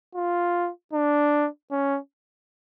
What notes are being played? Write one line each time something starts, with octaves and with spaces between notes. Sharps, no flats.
F4
D4
C#4